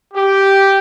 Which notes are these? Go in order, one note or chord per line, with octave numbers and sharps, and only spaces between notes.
G4